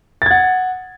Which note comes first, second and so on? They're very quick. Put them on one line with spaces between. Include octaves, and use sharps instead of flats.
A6 G#6 F#5